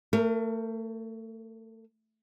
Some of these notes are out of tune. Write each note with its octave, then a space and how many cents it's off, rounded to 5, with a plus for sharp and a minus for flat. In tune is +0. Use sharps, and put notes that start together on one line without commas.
A3 +30 A#4 +0